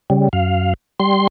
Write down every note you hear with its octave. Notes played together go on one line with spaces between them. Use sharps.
C#3 G3
F#2 F5
G3 C6